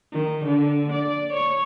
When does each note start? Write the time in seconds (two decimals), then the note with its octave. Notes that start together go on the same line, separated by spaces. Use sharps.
0.12 D#3
0.44 D3
0.92 D5
1.33 C#5